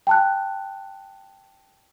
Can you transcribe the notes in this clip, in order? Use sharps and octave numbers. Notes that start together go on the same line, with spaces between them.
G5 A5 F#6